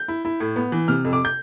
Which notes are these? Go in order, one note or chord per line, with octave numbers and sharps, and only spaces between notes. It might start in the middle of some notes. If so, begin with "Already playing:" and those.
Already playing: G6
E4
E4
A2
B3
E3
C3 F6
F2
D6
G6